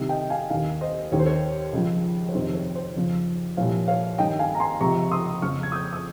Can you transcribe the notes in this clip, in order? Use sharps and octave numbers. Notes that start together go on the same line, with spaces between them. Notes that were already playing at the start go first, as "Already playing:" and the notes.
Already playing: C2 C3 D#3
D#5 G5
F5 G#5
D#2 D#3 F5 G#5
C5 D#5
D#2 D#3 C#5
C5
C#5
C#2 C#3 F3
C#5
F2 C3 D#3 C5
C#5
C5
F2 C#3 F3
C2 A#2 F3 C#5 F5
C#5 F5
G2 D#3 D#5 G5
F5 G#5
A#5
G#5 C6
C#2 C3 F3 A#5 C#6
C6 D#6
F2 C#3 F3 C#6 F6
G#6
D#6 G6
D#6